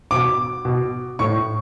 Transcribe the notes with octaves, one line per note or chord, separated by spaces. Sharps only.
B2 D6
B2
A2 C#6